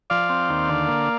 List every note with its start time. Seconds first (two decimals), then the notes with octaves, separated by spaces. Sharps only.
0.10 F3 D5 F5
0.29 C4
0.49 D#2
0.69 D3
0.88 A#3